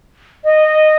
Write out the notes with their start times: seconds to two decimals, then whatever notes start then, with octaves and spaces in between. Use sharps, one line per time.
0.44 D#5